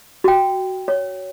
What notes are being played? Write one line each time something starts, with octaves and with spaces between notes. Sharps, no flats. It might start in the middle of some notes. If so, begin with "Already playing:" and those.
F#4 G5
C#5